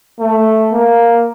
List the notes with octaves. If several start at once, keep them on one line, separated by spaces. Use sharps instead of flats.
A3
A#3